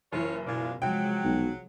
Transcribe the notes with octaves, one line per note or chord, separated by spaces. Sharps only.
F#1 E3 F4 C#5
B2 G#3 D4 F4
C3 F3 F#3 G#3 G5
B1